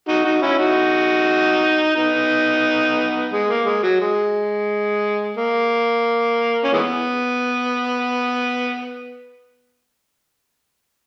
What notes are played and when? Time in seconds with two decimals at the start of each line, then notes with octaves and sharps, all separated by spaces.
0.08 D#4 F#4
0.24 D#4 F#4
0.41 C#4 E4
0.59 D#4 F#4
1.96 B3 D#4
3.32 G#3
3.48 A#3
3.65 G#3
3.83 F#3
4.01 G#3
5.37 A#3
6.64 C#4
6.73 E3 G#3 B3